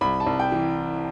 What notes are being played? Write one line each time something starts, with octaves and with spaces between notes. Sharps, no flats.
C2 B5
A5
C2
G5
E3